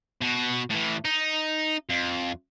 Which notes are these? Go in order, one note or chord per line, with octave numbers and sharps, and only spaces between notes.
B2 F#4
A2 E3
D#4
F2